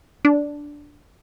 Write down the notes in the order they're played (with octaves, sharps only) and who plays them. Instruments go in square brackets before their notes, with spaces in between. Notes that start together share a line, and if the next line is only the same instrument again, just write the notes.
[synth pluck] D4